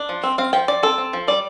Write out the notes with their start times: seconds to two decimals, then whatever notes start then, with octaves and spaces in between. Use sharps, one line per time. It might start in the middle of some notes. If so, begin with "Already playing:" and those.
Already playing: D4
0.09 F3
0.23 C4
0.38 C4 F5
0.53 F3 G5
0.68 F3 D5
0.83 C4 A4
0.98 C4
1.13 F3
1.28 G3 D5